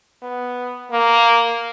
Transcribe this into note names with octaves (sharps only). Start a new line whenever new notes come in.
B3
A#3